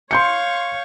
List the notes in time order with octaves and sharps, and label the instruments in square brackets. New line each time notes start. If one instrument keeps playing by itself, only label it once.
[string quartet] C#5 F5 C#6 [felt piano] C6 G6 C#7